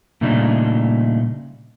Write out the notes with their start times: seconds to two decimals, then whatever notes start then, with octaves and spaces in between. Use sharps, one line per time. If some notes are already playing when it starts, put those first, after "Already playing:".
0.21 A#2 C#3 G3 A3 D4 D#4